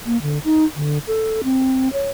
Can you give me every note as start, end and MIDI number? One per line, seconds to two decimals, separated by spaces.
0.06 0.20 58
0.22 0.39 50
0.44 0.65 63
0.76 0.98 50
1.07 1.42 69
1.44 1.91 60
1.93 2.10 73